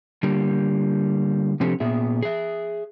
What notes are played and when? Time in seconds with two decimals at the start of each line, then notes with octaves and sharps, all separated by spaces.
0.23 D3 G3 A#3
1.60 C3 F3 C4 D4 G4 A4
1.80 A#2 B3 G#4 E5
2.23 G#4 E5